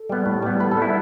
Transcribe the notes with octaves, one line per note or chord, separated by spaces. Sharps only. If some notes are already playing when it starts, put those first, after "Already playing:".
Already playing: A4
G3 B3
A2
G3 B3
A2 B4
A4
G3 B3 E4